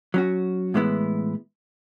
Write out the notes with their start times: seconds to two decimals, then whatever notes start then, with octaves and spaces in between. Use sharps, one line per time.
0.14 F#3 C#4 F#4
0.74 A2 E3 G#3 B3 E4